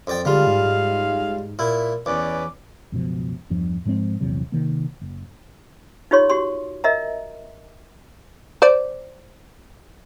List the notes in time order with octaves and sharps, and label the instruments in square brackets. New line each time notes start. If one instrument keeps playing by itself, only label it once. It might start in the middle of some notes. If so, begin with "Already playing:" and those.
[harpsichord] F2 D5 G5
[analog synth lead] D3 [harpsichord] G3 F4 [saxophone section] G#3 G#4 F5
[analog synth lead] G#2
G#2
[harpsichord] A#2 E4
[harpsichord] E2 [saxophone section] C#4 B4 D5 [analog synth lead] D6
[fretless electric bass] C#2 F#2 B2 F3
E2 G2 F3
G#2 F3 G#3 C4
A#1 E2 C3 F#3
C3 D#3 A#3
F#1
[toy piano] D#4 F4 G4 C#5 C6
F#4 G4 C6
A#4 D#5 E5 A#5
[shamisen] C5 D5